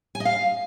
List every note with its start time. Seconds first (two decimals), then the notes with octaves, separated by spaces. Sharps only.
0.15 G#5
0.20 D#5
0.25 F5